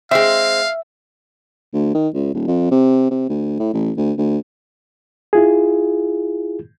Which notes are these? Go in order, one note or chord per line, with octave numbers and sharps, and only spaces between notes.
G#3 C4 E5 F5
D2
D#3
C#2
D#1
F2
C3
C3
D2
A2
A1
D2
D2
E4 F4 G#4